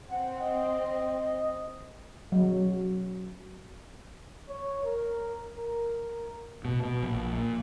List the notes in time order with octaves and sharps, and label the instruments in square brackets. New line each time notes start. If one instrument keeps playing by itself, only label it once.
[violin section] C4 [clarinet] F#5
[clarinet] D#5
[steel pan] F#3
[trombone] C#5
A#4
A#4
[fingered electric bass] B2
B2
A#1
A#2